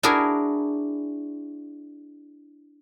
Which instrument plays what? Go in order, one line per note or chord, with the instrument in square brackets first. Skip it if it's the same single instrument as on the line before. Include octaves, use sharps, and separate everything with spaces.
[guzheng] D4 E4 F#4 G#4 A#4